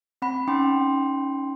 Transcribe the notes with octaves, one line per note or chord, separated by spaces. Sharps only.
C4 F#5 B5
C#4 D#4 G5 C6